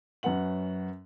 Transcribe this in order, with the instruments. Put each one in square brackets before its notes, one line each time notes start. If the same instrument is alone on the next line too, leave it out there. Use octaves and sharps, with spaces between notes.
[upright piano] F#2 C#4 B4 F#5 F#7